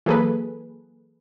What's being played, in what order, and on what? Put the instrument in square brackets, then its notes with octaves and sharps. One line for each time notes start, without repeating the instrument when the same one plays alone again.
[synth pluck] E3 F#3 A#3 G#4 A4 B4